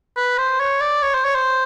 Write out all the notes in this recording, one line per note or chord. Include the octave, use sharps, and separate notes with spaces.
B4
C5
C#5
D5
C#5
C5
C#5
C5